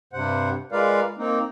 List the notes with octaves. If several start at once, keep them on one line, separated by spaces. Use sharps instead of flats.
G2 C3 C5 F#5
G#3 F4 A#4 B4 D5 F5
A#3 C4 D#4